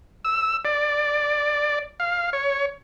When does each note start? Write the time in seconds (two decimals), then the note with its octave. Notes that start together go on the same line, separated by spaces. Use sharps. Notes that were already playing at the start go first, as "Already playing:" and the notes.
0.25 E6
0.65 D5
2.00 F5
2.33 C#5